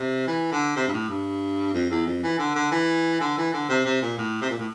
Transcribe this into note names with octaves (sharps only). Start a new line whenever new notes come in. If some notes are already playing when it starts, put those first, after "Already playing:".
Already playing: C3
E3
D3
C3
G2
A2
G2
F2
E2
F2
E3
D3
D3
E3
D3
E3
D3
C3
C3
A#2
A2
C3
A#2
A2